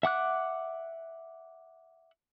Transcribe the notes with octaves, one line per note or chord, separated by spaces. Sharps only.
E5 F#5 D6 F#6